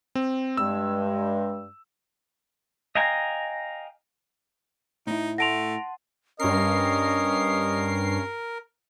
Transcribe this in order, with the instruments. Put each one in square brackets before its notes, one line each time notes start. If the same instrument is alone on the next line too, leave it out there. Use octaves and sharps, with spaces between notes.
[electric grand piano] C4
[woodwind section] G2 G#3 [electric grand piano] E6
[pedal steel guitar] D#5 F5 G5 G#5 A#5
[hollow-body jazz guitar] A2 E4 [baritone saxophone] D#4
[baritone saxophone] A3 [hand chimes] F#5 A5 C6 [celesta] A#6 D7 F7
[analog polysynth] G2 C7 [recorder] C#4 [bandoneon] A#4 [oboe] D#5